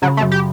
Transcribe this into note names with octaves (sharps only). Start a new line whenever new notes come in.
C#3 F#3
A3
F#2
G4